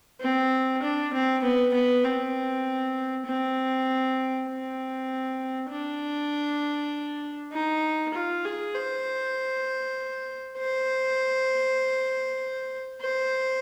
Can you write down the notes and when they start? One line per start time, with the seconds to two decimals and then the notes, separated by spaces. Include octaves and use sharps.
0.21 C4
0.82 D4
1.13 C4
1.43 B3
1.73 B3
2.04 C4
3.26 C4
4.48 C4
5.70 D4
7.52 D#4
8.14 F4
8.45 G#4
8.75 C5
10.58 C5
13.01 C5